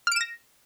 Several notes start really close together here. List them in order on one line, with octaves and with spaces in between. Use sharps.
F6 D7 E7 A#6